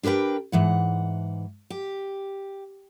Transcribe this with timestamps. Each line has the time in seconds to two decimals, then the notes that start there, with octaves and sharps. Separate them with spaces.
0.03 D4 G4 A#4 B4 G5
0.52 G#2 E3 F#5
1.70 G4